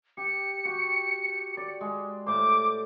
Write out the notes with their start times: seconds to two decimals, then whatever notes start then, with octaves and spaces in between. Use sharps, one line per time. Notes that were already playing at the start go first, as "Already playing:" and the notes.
0.17 G4 C#7
0.65 F#4 G4
1.57 D5
1.81 G#3
2.26 A2 C5 D6